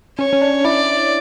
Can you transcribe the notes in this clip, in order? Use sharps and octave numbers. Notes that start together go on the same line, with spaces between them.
C#4 C#5
C#4
D4
E4 D5